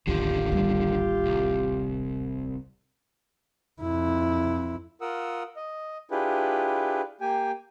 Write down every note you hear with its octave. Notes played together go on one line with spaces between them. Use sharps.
D1 A1 D#2 D3 D#3 F4 G4
G3 B3
C2
F2 E4
F4 A#4 F#5 D#6 E6
D#5
D4 E4 F4 G4 G#4 B4
A#3 G4 G5 G#5